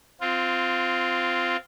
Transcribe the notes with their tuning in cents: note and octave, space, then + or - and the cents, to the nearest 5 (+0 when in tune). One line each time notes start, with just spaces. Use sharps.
C4 -15 F4 +0